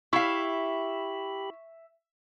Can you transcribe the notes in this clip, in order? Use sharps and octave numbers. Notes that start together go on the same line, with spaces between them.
E4 G4 E5 F5 B5 C#6